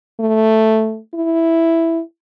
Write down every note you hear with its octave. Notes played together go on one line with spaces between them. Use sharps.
A3
E4